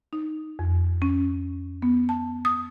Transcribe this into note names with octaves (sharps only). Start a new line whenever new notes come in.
D#4
F2
C#4
B3
A5
D#6